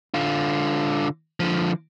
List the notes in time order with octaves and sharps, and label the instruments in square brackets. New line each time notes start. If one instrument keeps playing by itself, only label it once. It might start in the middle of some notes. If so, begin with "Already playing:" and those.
[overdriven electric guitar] D3 F4
D3 F3